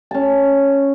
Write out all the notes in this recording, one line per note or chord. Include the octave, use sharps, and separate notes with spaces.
C#4 A5